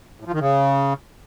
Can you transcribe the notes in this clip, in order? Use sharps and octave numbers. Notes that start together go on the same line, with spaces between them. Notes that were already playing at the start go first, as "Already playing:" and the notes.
A2
F3
D#3
C#3